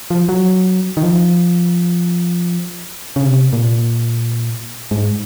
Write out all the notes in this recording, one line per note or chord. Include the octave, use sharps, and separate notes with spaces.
F3
F#3
D#3
F3
C#3
C3
A#2
G#2